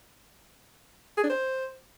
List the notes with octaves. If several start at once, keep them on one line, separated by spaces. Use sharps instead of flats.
G#4
D4
C5